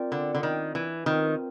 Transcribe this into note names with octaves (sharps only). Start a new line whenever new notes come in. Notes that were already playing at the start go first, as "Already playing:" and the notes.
Already playing: C4 F4 A#4 D5 G5
D3
D3
D#3
E3
D#3 C4 F4 A#4